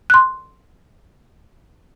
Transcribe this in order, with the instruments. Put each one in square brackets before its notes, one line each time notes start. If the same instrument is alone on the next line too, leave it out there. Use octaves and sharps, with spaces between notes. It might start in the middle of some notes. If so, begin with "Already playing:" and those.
[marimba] C6 F#6